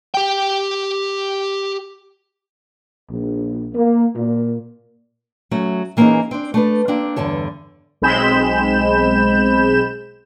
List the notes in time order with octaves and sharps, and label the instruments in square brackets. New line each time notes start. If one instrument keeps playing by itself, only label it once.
[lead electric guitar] G4 G5
[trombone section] A#1
A#3
A#2
[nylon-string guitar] F#3 A3 C#4
E3 A#3 B3 C#4 D#4 G#4
C4 D4
A3 D4 B4
A#3 C4 D4
E2 G2 D3 A4 C#5
[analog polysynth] B1 G#3 C4 B5 G6 E7